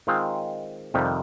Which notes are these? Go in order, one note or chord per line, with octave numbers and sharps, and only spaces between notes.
D#3 G#3 C4 F4
F2 C3 D#3 G3